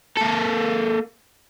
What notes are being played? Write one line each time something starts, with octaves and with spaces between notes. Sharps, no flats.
A#3 A4